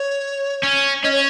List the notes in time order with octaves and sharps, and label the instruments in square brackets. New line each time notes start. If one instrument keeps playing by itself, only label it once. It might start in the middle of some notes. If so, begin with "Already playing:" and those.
Already playing: [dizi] C#5
[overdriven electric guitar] C#4
[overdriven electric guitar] C#4 [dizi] D#5
[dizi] C#5